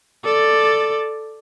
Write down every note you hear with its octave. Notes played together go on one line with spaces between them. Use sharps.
A4 D5